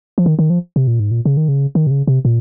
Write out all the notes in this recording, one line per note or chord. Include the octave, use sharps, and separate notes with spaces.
F3
D#3
D#3
F3
C3
A#2
G#2
A#2
C#3
D#3
C#3
D#3
C3
C#3
C3
A#2